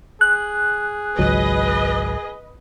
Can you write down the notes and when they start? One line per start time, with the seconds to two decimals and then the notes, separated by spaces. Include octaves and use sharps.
0.21 G#4 F#6
1.19 G#1 C#2 F#3 B4 D#5